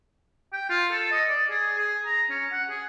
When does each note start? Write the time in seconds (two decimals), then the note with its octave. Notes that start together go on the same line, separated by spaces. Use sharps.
0.53 G5
0.70 F4
0.91 A4
1.12 D#5
1.29 D5
1.50 G#4
1.78 G#4
2.06 A#5
2.30 C#4
2.52 F#5
2.70 G#4